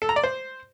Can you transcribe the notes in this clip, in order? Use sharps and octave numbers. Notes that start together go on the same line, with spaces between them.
A4
A#5
D5
C5